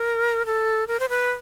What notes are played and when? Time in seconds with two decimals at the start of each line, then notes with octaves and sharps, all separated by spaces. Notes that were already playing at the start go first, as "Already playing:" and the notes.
Already playing: A#4
0.46 A4
0.87 A#4
1.00 C5
1.09 B4